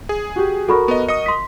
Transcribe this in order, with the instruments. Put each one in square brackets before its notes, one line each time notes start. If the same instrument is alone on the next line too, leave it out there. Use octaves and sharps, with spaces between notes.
[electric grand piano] G#4
[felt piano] F#4 G4
[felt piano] F#4 A#4 [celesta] A4 B5 C#6
[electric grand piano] B3 D#5
[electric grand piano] D#5 D#6 [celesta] C#7
[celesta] C6 B6